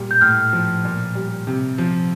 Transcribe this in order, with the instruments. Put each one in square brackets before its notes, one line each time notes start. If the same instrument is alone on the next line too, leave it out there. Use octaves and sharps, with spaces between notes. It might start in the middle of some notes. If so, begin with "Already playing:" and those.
Already playing: [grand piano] A#2 G3
[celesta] G6
[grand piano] A2 [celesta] F6
[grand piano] F3
A#2
G3
C3
F3